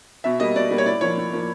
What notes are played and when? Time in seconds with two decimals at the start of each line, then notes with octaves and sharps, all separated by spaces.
0.24 B2 E5
0.40 G3 A#3 D#5
0.56 B2 D5
0.71 G3 A#3
0.78 C#5
0.86 A2 D5
1.01 F3 A#3 C#5
1.17 A2
1.33 F3 A#3